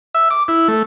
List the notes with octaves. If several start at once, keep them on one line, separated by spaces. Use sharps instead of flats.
E5
D6
E4
A3